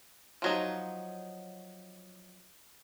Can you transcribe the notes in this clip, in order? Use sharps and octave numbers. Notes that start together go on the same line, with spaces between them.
F3 F#3 D#4